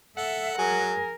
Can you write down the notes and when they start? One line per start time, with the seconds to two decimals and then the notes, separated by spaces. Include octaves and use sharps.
0.17 A4 E5 F#5
0.58 F#3 G#4 A#4 G#5